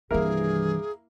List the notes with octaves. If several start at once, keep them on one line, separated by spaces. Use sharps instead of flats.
C2 G2 D#3 E3 A#3 E4 G#4 A#4